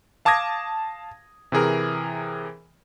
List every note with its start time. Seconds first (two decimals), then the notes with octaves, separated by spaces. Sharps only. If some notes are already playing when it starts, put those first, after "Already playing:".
0.25 F5 A5 D6 D#6 G#6 A#6
1.52 C3 E3 G#4 A#4